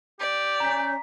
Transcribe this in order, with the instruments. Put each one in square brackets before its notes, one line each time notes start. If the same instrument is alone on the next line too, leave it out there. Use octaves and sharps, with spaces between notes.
[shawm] G4 [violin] D5
[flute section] C#4 G#5 G6 [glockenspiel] A#5 B6